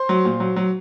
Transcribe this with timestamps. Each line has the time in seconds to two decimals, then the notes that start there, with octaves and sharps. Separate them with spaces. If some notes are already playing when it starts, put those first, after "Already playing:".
Already playing: C5 C6
0.09 F#3
0.25 A#2
0.40 F#3
0.56 F#3